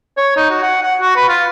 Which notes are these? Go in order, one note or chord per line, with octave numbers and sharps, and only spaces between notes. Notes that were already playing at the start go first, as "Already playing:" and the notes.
C#5
D#4
F#4
F#5
F#5
F#4
B4
F4